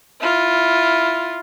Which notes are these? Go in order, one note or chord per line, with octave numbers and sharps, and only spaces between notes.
E4 F4